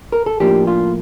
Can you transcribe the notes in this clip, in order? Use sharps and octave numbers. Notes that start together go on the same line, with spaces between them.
A#4
A4
A2 F3 A#3 D4 G4
F4